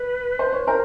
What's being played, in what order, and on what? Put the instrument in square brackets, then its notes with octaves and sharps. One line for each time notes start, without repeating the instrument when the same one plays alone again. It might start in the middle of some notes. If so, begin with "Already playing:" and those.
Already playing: [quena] B4
[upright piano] C5
C#5
A#4 C5